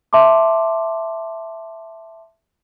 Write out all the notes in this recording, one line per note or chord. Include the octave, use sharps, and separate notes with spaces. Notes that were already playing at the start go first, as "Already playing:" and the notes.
E5 A5 C6 D6